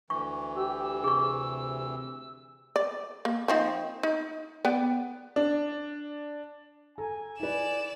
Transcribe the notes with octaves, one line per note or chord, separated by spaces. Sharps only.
D2 E3 C#6
G4 E6
C3 G#4 C#6
D5
A#3
F3 C4 D#4
D#4
B3 D5 G5
D4
A4 G#5 A#5
E4 B4 D5 E7